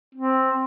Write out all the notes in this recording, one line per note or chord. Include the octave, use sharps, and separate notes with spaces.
C4